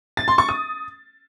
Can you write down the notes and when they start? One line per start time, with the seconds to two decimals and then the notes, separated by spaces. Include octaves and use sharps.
0.17 A6
0.28 C6
0.38 C#6
0.49 D#6